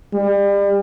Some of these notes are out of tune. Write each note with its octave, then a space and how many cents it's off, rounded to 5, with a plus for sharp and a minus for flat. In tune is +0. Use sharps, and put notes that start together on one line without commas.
G3 +35